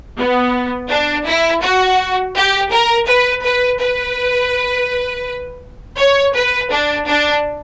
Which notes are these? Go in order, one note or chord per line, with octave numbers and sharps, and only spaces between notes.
B3
D4
E4
F#4
G4
A#4
B4
B4
B4
C#5
B4
D4
D4